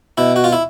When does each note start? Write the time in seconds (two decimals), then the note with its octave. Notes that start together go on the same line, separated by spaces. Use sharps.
0.18 B2 E4
0.36 F#4
0.44 F4
0.52 E4